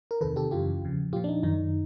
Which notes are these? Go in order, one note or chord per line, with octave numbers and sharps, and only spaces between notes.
A#4
E2 C3 D#3 A4 B4
G4 A4
F#2 C#3 E3 F4 G4
E2 C#3 F3
A#2 F3 F4 G4
D4
D#4
F#2 D#3 D#4